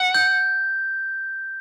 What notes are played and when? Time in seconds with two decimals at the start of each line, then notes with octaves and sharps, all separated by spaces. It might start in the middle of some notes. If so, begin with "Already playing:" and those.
Already playing: F#5
0.14 G6